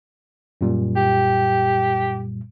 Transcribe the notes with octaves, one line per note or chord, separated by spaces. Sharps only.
F#2 A#2 G3
G4